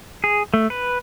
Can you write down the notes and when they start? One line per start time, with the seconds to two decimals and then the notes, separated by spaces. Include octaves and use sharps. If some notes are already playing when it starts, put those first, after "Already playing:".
0.24 G#4
0.54 A3
0.70 B4